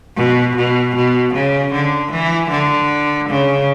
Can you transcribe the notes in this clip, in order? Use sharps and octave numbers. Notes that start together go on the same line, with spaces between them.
B2
B2
B2
C#3
D3
E3
D3
C#3